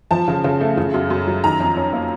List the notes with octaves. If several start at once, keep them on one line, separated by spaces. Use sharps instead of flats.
F3 A5
C#3
C#3
A3
C#3
F#2
F#2
F#3
D#3 A#5
F2
C#4
A#3